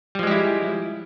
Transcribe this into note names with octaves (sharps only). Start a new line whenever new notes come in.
F3 G3 G#3 E4 G4